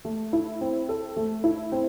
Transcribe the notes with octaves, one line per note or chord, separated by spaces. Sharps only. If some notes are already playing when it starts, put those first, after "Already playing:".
A3
E4
C4
A4
A3
E4
C4